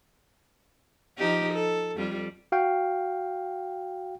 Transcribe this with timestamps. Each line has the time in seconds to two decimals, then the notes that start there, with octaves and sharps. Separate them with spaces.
1.18 F3 D#4 G4
1.54 A4
1.95 F2 G3 F4
2.52 F#4 F5 G5